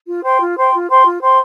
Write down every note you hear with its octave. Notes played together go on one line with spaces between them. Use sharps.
F4
C5 G5 C6
F4
C5 G5 C6
F4
C5 G5 C6
F4
C5 G5 C6